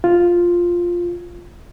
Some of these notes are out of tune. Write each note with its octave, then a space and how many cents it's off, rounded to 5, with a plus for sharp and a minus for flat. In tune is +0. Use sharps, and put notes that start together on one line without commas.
F4 +0